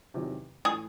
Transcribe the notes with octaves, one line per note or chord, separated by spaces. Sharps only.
E2 C3 D#3 F#3
A2 E3 A3 G#4